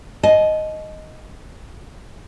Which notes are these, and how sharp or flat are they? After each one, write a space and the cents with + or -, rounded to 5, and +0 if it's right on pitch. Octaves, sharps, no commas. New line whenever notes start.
D#5 +0 A5 -40